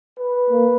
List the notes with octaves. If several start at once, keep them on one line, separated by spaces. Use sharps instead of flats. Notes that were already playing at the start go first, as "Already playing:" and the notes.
B4
A#3